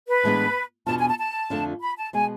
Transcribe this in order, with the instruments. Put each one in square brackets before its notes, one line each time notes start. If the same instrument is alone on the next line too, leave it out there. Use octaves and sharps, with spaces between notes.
[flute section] B4
[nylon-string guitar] A2 E3 G#3 B3 D4
[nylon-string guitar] E2 B2 B3 D4 F4 [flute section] A5
[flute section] G#5
A5
A5
[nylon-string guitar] F2 D3 A3 D4 F4
[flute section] B5
A5
[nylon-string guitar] B2 G#3 B3 [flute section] G#5